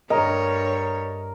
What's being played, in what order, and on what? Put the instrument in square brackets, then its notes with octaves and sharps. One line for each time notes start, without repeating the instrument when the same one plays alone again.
[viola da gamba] G2 C#5 [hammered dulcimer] A#4 [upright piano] D#5